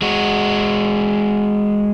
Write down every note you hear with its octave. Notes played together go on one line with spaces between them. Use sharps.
G#3 F#4